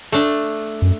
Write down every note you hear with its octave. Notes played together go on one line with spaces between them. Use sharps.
A3 D4
F#2